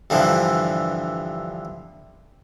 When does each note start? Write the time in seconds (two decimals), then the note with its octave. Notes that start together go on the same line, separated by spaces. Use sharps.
0.10 G2 D3 E3 F3